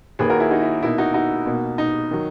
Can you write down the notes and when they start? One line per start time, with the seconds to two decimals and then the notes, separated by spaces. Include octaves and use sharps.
0.19 D#2 D#3 A#3 G#4 B4
0.30 F#4 A#4
0.40 E4 G#4
0.51 D#4 F#4
0.62 E4
0.82 B2 A#3 D#4 E4
0.98 D#4 F#4
1.14 D#4 F#4
1.46 B2 A#3 D#4
1.78 D#4
2.11 D#3 F#3